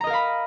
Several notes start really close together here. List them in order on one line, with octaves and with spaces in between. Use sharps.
A#5 D#5 A#4 F5 B5